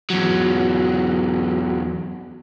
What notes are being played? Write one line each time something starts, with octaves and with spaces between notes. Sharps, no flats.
E2 F#3